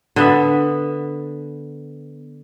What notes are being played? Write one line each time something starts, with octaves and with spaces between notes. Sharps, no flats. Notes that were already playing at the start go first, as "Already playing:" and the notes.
D3 B3 E5